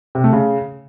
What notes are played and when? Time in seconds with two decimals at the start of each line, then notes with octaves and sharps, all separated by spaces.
0.15 C3
0.24 A3
0.33 C#3